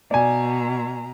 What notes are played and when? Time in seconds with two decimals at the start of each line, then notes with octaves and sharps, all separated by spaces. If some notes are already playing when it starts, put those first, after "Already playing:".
0.11 B2 D5 G#5 A#5